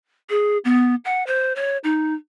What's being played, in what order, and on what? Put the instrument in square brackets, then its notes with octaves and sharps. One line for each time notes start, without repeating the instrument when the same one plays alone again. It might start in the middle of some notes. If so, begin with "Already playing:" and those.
[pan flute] G#4
B3
F#5
C5
C#5
D#4